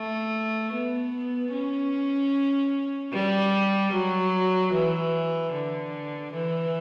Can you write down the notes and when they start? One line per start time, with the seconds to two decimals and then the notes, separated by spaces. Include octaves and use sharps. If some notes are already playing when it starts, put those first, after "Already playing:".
Already playing: A3
0.73 B3
1.53 C#4
3.13 G3
3.93 F#3
4.73 E3
5.53 D3
6.33 E3